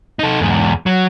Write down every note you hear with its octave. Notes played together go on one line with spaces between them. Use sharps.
D#4 A4
E2 G#2
F#3